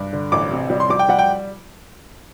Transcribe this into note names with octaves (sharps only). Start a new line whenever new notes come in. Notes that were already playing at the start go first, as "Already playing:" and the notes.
Already playing: G2
D3
A1 D6
C3
G3
C6
G3 D6
G5
G3 F#5
G5